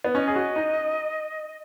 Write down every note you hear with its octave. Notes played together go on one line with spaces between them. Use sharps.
B3
C#4 D#5
G#4
F#4
D#4